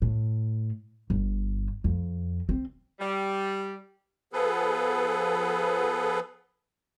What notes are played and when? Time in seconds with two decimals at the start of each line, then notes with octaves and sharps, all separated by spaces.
0.02 A2
1.10 G1
1.84 F2
2.49 C4
3.00 G3
4.33 F3 B3 G#4 A4 B4